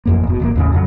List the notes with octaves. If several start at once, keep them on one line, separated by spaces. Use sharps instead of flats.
A1 F2 A#3
F#1 B2
D1 G1 A#3
D#2 A2 C#3
F2 C#3 F#3